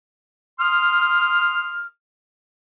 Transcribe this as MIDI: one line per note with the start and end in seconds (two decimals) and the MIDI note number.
0.60 1.87 84
0.60 1.87 87
0.60 1.87 89